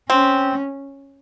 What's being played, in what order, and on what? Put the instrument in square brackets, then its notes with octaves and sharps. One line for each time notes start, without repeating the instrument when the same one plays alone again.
[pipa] C4 [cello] C#4